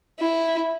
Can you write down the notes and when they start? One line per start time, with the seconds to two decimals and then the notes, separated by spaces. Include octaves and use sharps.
0.20 E4